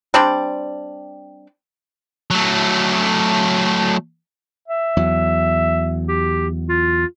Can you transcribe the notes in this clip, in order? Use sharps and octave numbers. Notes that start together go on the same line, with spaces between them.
G3 C4 D4 D5
F#3 A3
E5
E2 F#3
G4
F4